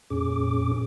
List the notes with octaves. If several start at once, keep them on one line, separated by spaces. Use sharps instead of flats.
F2 A#2 C#4 G#4 D6